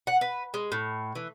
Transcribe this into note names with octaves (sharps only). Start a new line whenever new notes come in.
F#5
B4
G#3
A2
E3